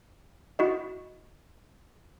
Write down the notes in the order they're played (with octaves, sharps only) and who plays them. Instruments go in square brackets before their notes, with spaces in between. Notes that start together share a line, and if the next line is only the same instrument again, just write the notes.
[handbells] E4 F#4 D#5